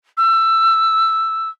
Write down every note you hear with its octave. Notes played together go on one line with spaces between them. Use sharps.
E6